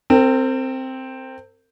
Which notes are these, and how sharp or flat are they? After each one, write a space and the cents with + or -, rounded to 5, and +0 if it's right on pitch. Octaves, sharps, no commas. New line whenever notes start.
C4 +0 A#4 -45